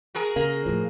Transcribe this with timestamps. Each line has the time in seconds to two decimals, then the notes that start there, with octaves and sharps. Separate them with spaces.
0.15 F#4 G#4 A#4
0.36 C#3 A#3
0.66 A2 F3